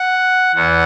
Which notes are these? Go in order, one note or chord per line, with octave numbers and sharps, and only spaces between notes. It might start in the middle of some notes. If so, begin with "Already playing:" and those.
Already playing: F#5
E2 F#5